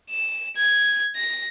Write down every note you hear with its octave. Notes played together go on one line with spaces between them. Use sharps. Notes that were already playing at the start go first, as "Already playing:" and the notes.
E7
G#6
A#6